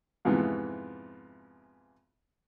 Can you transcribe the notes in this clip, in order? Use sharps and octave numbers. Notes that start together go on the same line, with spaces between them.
F2 G#2 C3 E3 B3 F4